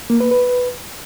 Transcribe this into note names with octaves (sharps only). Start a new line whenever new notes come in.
A#3
B4
B4